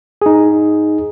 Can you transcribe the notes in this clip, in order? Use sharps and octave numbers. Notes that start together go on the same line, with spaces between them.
D#4 G#4